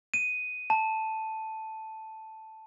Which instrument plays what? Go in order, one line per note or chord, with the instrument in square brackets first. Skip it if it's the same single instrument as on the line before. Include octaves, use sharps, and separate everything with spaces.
[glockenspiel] D#7
A5